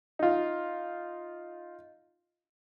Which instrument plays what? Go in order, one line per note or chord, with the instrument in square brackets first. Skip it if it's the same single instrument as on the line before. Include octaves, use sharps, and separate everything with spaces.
[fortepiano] D#4 F4